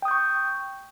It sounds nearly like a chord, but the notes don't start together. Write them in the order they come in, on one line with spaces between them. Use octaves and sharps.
G5 D#6 G6 C#6